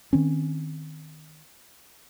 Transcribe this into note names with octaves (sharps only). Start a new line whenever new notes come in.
D#3 C4 C#4